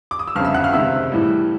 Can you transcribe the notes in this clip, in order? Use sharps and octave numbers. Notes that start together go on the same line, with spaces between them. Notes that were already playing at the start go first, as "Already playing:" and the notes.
D6
D#6
E6
G1 F2 C#3 F5 F6
E5 E6
F#5 F#6
F5 F6
C#2 C3 D#3 E5 E6
A2 E3 G3